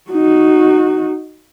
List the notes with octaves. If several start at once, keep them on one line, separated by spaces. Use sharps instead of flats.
D#4 F#4